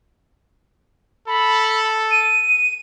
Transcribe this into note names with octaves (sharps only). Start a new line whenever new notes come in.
A4 B5
D#7